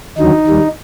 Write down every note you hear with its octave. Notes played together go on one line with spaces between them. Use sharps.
D#2 D3 F#3 D#4
D#2 D#3 G3